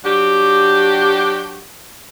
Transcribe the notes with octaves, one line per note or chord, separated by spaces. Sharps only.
F#3 D4 F#4 G4